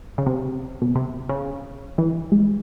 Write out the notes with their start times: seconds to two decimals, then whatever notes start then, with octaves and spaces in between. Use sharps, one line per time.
0.18 C#3
0.26 C3
0.82 B2
0.95 C3
1.29 C#3
1.98 E3
2.32 G#3